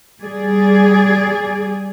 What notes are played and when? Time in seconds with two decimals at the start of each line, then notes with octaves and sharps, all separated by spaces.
0.23 G3 G#4 D5